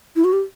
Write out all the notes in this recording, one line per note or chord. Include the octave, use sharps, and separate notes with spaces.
E4
F#4
G4